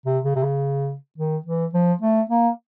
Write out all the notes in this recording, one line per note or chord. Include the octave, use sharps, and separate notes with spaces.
C3
C#3
C3
C#3
D#3
E3
F3
A3
A#3